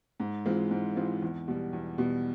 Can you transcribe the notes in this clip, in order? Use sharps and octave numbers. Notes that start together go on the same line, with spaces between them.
G#2
E3 G#3 C4 F4
G#2
E3 G#3 C4 F4
E2
B2 G3
E2
B2 G3